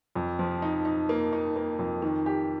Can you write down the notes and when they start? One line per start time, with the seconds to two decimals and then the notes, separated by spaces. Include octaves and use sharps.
0.15 F2
0.39 F3
0.62 D#4
0.85 D#4
1.09 A#3
1.33 D#4
1.56 A#3
1.79 F2
2.02 D#3
2.26 G4